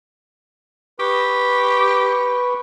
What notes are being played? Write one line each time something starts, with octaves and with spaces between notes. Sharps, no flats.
G4 B4 C#6